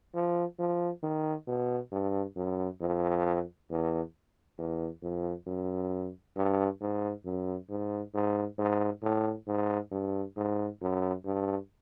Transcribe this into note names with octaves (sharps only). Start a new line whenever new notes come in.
F3
F3
D#3
B2
G2
F#2
F2
E2
E2
F2
F#2
G2
G#2
F#2
G#2
G#2
G#2
A2
G#2
G2
G#2
F#2
G2